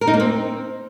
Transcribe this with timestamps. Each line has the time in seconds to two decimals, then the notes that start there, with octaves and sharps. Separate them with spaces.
0.01 A#4
0.07 D#4
0.14 A#3
0.20 C4